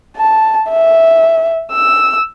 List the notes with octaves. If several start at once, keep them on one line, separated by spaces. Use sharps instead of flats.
A5
E5
E6